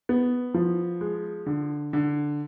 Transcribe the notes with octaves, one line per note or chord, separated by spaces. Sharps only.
B3
F3
G#3
D3
D3